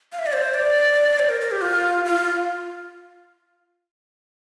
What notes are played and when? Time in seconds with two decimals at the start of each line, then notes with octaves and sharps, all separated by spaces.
0.12 F5
0.19 E5
0.26 D5
0.33 C5
0.54 D5
1.19 C5
1.29 A#4
1.41 A#4
1.51 G4
1.61 F4
2.05 F4